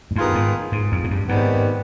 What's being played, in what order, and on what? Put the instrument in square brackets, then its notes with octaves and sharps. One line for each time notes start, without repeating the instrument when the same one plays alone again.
[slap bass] G#2
[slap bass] G2 [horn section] D#3 B3 F4 G#4
[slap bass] G#2
G#2
F2
G#2
G2
[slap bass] G#2 [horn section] C3 D#3 G3 B3